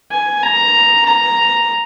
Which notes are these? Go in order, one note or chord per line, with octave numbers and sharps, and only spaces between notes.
G#5
A#5
A#5